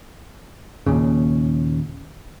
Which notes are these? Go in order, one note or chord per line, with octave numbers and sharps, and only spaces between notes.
D#2 A#2 C#3